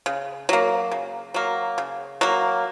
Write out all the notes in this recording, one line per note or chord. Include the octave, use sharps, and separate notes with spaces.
C#3
F#3 A#3
C#3
F#3 A#3
C#3
F#3 A#3